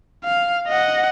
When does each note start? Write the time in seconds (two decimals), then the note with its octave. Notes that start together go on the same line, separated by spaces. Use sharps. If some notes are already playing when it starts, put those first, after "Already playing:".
0.24 F5
0.68 D#5 F#5